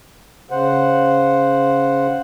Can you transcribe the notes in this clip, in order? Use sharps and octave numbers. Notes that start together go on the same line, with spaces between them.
C#3 C5 F#5